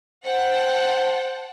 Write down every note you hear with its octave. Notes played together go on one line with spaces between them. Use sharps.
C5 F#5 G5 A5